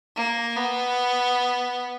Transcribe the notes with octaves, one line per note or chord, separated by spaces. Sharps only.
A#3
B3